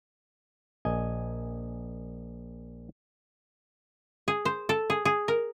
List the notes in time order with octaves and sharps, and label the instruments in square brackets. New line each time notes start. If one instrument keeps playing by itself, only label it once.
[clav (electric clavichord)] A#1 D#5 G#5
[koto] G#4
C5
A4
G#4
G#4
A#4